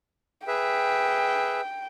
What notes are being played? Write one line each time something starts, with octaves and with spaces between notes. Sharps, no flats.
G#4 B4 E5 G5